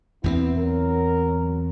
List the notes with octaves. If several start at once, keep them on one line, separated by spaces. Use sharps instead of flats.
E2 A3 B3 C4 E4
F#3 A#4